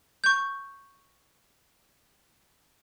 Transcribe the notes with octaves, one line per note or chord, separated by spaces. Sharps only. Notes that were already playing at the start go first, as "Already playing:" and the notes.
C#6 G6